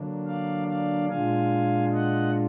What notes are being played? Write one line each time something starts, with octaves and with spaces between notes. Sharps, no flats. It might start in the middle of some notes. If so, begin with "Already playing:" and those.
Already playing: D3 F#3 A#3 D4
D5 F5
D5 F5
A#2 G#3 D4 F4 F5 G#5
D#5 F#5